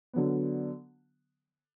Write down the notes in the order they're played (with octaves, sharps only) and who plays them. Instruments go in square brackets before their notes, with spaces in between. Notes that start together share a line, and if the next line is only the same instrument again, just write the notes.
[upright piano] D3 F#3 B3